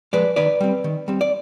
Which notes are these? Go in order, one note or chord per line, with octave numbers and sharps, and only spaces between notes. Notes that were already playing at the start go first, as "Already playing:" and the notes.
F3 G#3 B4 D5
D#3 B4 D5
G3 C4
D#3
G3 C4
D5